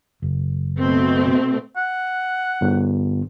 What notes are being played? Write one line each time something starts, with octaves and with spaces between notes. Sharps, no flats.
F#1
B2 A3 C4
F#5
G1